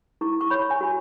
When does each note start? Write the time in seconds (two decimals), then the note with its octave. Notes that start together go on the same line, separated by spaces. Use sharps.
0.21 E4 C#6
0.41 C#6
0.50 C#5 B5
0.70 G#5
0.81 F#4